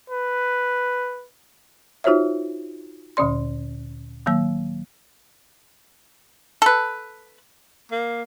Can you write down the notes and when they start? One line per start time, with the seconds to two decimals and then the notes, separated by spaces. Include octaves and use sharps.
0.10 B4
2.04 D#4 F4 F#4 C5 C#5 E5
3.17 D2 A#2 D3 C#4 D5 C6
4.26 D#3 F#3 A#3 E6
6.62 A4 B4
7.92 A#3